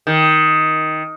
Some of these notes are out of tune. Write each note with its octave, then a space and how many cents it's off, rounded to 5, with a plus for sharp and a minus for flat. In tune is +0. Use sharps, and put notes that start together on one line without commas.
D#3 +10